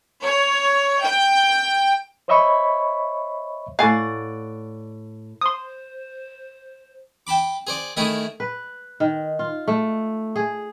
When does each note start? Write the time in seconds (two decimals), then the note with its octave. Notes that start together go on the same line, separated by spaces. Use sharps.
0.24 C#5
1.02 G5
2.28 C5 C#5 D#5 E5 B5 C#6
3.79 A2 D5 F5 F#5 G#5
5.41 C5 C6 D#6
7.27 G5 A5 B5 D6
7.67 G#4 C5 D5
7.97 D#3 A3 E4 G#4 D#6
8.40 B4
9.00 D#3
9.39 F4
9.68 A3
10.36 G#4